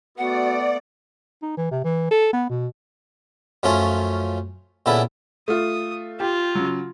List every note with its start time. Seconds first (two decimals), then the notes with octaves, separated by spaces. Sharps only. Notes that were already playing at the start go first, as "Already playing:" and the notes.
0.18 A3 B3 F#4 D5 F#5
1.42 D#4
1.57 E3
1.71 C3
1.84 E3
2.11 A4
2.33 B3
2.50 B2
3.63 F#2 F3 A3 C#4 F4
4.86 A#2 C#3 B3 E4 A4
5.48 A3 F4 D#6
6.20 F4 G4
6.55 C#3 F#3